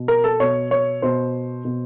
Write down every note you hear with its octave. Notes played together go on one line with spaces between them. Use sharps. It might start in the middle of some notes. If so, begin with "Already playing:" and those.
Already playing: B2
A#4
A4
B2 C#5
C#5
B2 C5
B2